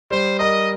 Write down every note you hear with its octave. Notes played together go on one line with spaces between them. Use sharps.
G3 C5
A#4 D#5